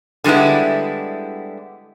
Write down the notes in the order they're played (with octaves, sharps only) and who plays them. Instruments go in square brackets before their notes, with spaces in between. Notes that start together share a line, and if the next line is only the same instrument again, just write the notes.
[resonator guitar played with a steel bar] D3 G3 G#3 B3 E4